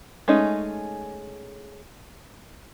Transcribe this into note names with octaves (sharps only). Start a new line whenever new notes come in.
G#3 A3 C#4 D#4